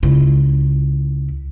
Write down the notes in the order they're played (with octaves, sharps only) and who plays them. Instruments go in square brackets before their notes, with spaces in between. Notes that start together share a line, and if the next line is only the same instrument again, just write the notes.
[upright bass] C#2 E4